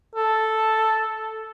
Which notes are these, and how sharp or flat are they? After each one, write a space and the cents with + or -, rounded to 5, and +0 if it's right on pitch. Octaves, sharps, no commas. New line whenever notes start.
A4 +0